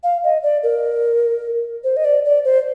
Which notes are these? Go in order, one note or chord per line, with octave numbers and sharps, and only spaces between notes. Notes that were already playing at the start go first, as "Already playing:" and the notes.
F5
D#5
D5
A#4
C5
D#5
D5
D5
C5